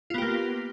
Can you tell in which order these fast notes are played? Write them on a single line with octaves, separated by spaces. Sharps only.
F4 B3 G4 A#3